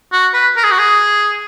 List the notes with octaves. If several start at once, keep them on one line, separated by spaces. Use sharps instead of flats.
F#4
B4
A#4
G#4
F#4
G#4